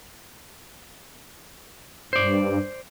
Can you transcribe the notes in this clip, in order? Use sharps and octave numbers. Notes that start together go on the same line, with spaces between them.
G2 C5 D5